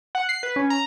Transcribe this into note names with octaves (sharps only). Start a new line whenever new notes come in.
F#5
C7
B4
C#4
A#5